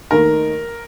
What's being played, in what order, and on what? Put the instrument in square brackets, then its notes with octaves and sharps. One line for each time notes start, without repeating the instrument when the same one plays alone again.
[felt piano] D#2 D#3 A3 D#4 [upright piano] A#4